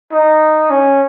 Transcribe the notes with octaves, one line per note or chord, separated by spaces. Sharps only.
D#4
C#4